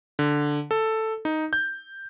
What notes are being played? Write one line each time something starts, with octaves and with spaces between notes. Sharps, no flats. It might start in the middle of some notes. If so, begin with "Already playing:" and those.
D3
A4
D#4
G6